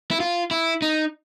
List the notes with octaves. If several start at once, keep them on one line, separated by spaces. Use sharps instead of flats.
E4
F4
E4
D#4